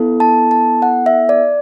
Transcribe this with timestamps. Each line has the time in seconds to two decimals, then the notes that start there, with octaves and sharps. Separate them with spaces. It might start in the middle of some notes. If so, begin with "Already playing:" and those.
Already playing: B3 E4 A4
0.20 A5
0.51 A5
0.82 F#5
1.06 E5
1.29 D5